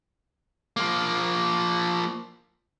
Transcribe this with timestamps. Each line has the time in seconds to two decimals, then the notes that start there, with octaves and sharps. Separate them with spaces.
0.77 F3 A#3